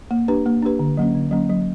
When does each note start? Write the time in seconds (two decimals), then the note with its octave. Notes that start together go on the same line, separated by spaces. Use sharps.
0.11 A#3
0.28 D4 G4 B4
0.46 A#3
0.62 D4 G4 B4
0.79 D3
0.98 F#3 A#3 C#4
1.15 D3
1.31 F#3 A#3 C#4
1.50 F#3